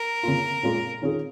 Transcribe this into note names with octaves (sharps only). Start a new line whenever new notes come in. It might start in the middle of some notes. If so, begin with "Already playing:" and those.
Already playing: A#4
C#3 A#3 F4
A#2 G#3 C#4 F4 G#4
D#3 C#4 F4 G#4